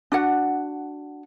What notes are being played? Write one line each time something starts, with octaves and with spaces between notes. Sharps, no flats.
D4 F#4 F#5